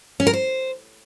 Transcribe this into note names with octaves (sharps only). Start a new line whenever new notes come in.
C#4
A#4
C5